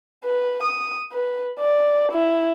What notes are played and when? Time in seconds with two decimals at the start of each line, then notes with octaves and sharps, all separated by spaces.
0.25 B4
0.63 D#6
1.13 B4
1.59 D5
2.12 E4